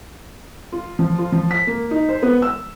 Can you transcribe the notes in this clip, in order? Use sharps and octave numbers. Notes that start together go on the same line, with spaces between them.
F4
F3
F4
F3
B6
A#3
D#4
C5
B3
E6